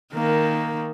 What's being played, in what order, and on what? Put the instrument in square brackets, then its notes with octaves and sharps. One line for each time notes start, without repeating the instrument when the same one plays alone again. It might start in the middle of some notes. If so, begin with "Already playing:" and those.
[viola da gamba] D#3 [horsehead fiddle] A#3